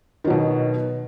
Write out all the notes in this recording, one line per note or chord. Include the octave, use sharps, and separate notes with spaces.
B2 D#3 F#3